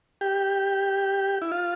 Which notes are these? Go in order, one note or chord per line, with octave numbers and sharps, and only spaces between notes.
G4
E4
F4